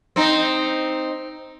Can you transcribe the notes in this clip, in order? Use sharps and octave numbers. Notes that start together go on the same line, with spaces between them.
C4 D#4